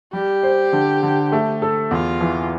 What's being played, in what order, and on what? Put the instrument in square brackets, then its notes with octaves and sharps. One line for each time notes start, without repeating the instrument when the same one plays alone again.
[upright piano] G3 [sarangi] G4
[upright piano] C5
D3
D3
A3
A4
[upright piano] E2 [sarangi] F4
[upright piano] E3